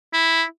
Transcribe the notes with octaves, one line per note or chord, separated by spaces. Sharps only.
E4